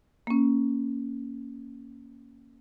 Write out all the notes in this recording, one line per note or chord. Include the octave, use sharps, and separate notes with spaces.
A#3 C#4